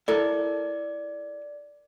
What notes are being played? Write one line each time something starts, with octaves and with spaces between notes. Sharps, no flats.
E4 A4 A#4 D5